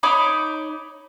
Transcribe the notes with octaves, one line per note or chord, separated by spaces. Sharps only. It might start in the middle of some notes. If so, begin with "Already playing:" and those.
D#4 C#5 B5 D6